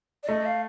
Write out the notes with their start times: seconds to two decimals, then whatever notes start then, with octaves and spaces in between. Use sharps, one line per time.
0.23 D5
0.28 A3 D#5
0.45 F5